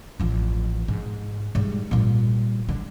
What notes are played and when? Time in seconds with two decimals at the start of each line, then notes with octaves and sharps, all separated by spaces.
0.20 A1 F3
0.88 G#2
1.55 G#2 G3
1.91 A#2 G3
2.69 D3